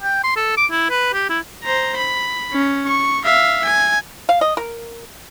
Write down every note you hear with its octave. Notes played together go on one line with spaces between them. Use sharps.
G5
C6
A4
D6
E4
B4
G4
E4
C5 A#5
B5
C#4
C#6
E5 F5
G#5
F5
D#5
A#4